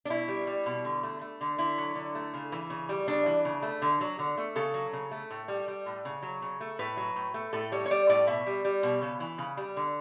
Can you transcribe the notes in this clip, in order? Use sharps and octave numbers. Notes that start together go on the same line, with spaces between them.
D4
B2 E4
G3
G3
B2
D3
A3
A3
D3
D3 E4
F#3
D3
A3
C#3
E3
C#3
G3
C#3 D4
E3
C#3
A3
D3
F#3
D3
A3
C#3 A4
F#3
C#3
A3
A2
G3
G3
A2
C#3
F#3
C#3
A3
A2 B4
F#3
A2
A3
A2 A4
G3 C#5
C#5
G3 D5
A2 D5
B2 E5
G3
G3
B2
C#3
E3
C#3
G3
D3